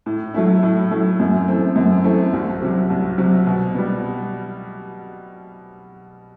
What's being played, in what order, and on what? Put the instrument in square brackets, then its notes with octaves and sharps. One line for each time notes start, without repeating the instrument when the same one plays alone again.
[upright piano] A2
F#3 A3 E4
A2
F#3 A3 E4
F#2
E3 A3 C4
F#2
E3 A3 C4
C2
C3 F#3
C2
C3 F#3
B2
G3 B3